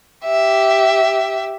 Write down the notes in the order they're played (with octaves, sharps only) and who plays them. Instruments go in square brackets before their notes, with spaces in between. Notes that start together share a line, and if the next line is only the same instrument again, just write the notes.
[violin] G4 E5